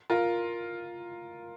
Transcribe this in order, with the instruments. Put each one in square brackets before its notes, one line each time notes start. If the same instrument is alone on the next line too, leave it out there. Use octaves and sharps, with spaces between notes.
[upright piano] F4 A#4